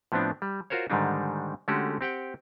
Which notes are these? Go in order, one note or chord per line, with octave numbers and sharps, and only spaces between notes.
A2 F3 B3 C4 D4
G3
F4 F#4 A#4 C5 C#5
G#2 D3 D#3 G3 D4 D#4
D3 G#3 A3 C#4 F#4 G4
C4 G4 F#5 G5